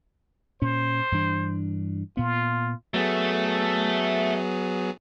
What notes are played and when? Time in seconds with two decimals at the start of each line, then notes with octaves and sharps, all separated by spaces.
0.62 A#2 C#4 C5
1.12 G2 E3 D4
2.17 A#2 B3 F4
2.94 F#3 A3 B3 G#4